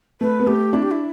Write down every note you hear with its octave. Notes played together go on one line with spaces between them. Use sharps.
A3 B4
B3
A3 G4
D4 E4
G4
E4